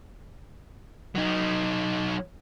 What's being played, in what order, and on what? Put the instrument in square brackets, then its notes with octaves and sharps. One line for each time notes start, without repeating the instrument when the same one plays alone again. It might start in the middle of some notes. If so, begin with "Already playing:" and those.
[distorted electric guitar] F#3 D#4